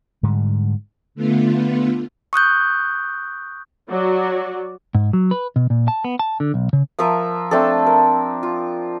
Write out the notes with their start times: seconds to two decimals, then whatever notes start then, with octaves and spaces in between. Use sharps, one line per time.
0.23 G#2 D3 G3
1.15 D3 A3 B3 F4
2.33 C#6 D#6 F#6 G6
3.90 F#3 F#4 D5
4.95 G#2
5.13 F#3
5.31 B4
5.56 B2
5.70 A#2
5.88 A5
6.04 B3
6.19 A5
6.40 D3
6.54 B1
6.73 C#3
6.99 F3 F4 A#4 E5
7.51 A3 C4 D4 A4
7.87 A#4
8.43 F4